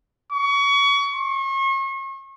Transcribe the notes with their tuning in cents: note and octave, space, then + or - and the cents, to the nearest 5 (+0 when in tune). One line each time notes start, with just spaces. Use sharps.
C#6 +30
C#6 -40